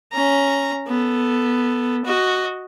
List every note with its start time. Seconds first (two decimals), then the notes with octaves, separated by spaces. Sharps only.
0.13 C#4 A#5
0.87 B3 A4
2.05 F#4 D#5